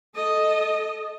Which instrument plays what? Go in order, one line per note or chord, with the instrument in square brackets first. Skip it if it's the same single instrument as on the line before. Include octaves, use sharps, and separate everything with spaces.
[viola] A4 D#5